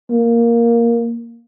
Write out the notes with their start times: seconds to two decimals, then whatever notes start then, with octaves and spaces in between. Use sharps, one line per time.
0.10 A#3